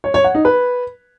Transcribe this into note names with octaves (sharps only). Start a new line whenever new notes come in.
C#5
C#5
F#5
D#4
B4